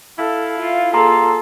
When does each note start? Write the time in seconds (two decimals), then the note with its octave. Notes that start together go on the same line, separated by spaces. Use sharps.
0.18 E4 A4 F5
0.58 F4
0.94 A#3 G#4 A4 A#5 C6